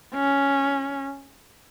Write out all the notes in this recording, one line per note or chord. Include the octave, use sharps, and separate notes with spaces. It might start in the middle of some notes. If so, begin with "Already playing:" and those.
C#4